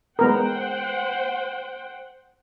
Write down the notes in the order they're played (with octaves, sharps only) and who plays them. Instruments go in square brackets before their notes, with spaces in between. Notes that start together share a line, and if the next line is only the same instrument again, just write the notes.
[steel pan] G#3 B3 A#4 [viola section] C5 F#5 G5